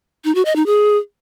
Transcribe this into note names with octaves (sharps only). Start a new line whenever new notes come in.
D#4
F#4
D#5
D#4
G#4